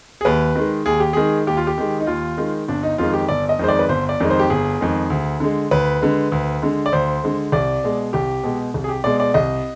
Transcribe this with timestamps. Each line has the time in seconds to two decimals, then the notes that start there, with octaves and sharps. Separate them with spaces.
0.21 G#4
0.25 D#2 B4
0.56 D#3 G#3
0.86 D#2 G#4
1.00 G4
1.13 D#3 G#3 G#4
1.47 D#2 G4
1.57 F4
1.67 G4
1.78 D#3 G#3
2.00 D#4
2.07 D#2 F4
2.37 D#3 G#3
2.68 G1 D4
2.83 D#4
2.98 F2 D#3 G#3 F4
3.13 G4
3.29 G1 D5
3.49 D#5
3.59 F2 D#3 G#3 C5
3.69 D5
3.79 B4
3.89 G1 C5
4.09 D5
4.20 F2 D#3 G#3
4.30 C5
4.39 G4
4.50 G1 G#4
4.81 F2 D#3 G#3
5.10 D2
5.40 D3 G#3
5.71 D2 B4
6.02 D3 G#3
6.32 D2
6.62 D3 G#3
6.86 D5
6.92 D2 C5
7.23 D3 G#3
7.52 C2 D5
7.84 B2 G#3
8.13 C2 G4
8.44 B2 G#3
8.74 C2
8.84 G#4
8.89 G4
9.04 B2 G#3 D5
9.20 D5
9.34 C2 D#5